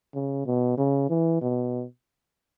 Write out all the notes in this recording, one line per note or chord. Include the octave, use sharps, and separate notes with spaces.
C#3
B2
C#3
E3
B2